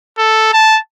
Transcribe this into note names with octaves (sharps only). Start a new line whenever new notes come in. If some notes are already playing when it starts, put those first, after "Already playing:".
A4
A5